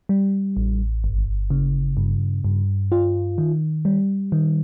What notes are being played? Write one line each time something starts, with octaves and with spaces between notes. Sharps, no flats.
G3
A1
G1
C#3
G2
G2
F4
D#3
G3
D#3